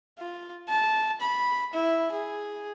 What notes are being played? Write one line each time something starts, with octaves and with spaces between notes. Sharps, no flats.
F4
A5
B5
E4
G#4